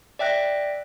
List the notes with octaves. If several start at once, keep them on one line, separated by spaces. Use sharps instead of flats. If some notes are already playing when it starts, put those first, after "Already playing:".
D5 E5 G5 F#6 A#6